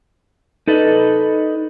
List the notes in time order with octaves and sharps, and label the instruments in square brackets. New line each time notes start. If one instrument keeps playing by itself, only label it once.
[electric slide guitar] D#4 A4 B4 D5 D#5